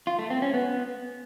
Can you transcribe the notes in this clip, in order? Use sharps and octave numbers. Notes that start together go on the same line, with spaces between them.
F4
A3
C4
C#4
B3